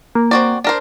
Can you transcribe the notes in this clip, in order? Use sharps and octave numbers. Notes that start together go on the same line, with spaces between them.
A#3
C4 F#4 D5
D4 A#4 C5